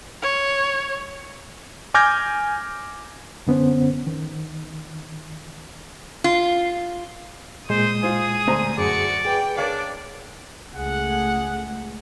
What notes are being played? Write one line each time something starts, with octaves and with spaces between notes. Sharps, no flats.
C#5
G#5 D6 F6 G6 G#6 A#6
F#2 D3 B3 C#4 C5
D#3
F4
A#2 G#3 C5 D#6
F4 G#4 C5
D2 C5 A#5
F#2 F#4 G#4 D5 C#7
G#4 B4 G5
D4 A#4 C#5 D5 F5
C#2 A3 G#4 F#5